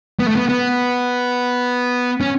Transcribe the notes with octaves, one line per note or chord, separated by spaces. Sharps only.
B3
A3
B3
B3
C#4